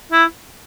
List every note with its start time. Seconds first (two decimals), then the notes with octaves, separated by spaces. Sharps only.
0.12 E4